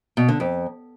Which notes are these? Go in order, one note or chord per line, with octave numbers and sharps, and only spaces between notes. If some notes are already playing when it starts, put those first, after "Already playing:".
B2
D3
F2